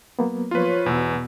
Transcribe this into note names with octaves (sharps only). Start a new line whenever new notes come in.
F#3 A#3 B3
F3 F4 B4 C#5
E2 B2 B4 E6